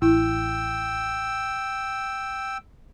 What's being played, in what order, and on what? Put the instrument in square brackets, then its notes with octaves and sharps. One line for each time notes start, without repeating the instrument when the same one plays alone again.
[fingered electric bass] A1 [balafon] E4 [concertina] G5 E6